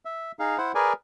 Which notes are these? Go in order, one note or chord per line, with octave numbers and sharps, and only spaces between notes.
E5
D#4 G#4 F5
E4 C5 F#5
G#4 A#4 B4 D5 G#5